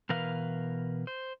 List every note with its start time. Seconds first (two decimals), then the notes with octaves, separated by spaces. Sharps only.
0.09 B2 E3 A#4 B4 F5
1.07 C5